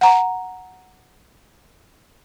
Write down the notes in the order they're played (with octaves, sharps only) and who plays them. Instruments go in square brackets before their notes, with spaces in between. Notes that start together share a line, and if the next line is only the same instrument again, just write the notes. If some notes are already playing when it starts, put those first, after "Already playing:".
[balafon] F#5 A#5